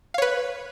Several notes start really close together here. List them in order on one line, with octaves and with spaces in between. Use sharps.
F5 C#5 B4